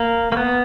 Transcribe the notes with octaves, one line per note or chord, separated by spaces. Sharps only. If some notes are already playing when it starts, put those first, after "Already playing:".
Already playing: A#3
A#3
B3